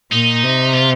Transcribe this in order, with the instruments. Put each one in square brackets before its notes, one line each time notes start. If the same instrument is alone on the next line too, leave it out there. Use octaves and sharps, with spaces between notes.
[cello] A#2 [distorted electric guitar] D#4
[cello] C3
[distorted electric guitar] F4